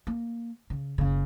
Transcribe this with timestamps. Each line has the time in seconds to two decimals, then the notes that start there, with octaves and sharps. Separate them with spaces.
0.07 A#3
0.70 C#3
0.98 F#1 C#3